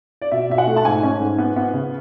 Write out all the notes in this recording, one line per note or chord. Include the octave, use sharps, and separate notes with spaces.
D5
B2 E5
B2 E5
F#5
A3
A5
G#2 G#5
C#4
G#2
B3
B3
C#3